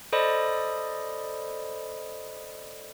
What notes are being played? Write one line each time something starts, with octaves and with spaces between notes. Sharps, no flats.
A4 C5 D5 D#5 B5 D#6